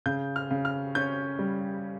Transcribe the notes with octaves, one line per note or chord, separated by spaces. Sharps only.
C#3 G6
F6
C#3
F6
C#4 G6
G3